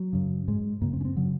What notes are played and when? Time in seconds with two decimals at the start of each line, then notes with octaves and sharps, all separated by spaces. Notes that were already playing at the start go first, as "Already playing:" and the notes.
Already playing: F#3
0.13 F#2 C#3
0.48 G#2 G#3
0.81 F#2 C#3 A#3
0.93 C4
1.01 C#4
1.05 C4
1.17 C#3 F#3